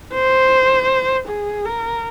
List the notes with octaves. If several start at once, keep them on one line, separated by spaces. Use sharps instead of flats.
C5
G#4
A#4